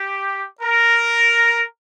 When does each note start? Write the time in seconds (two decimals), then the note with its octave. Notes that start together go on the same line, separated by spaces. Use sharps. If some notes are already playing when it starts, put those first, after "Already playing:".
Already playing: G4
0.61 A#4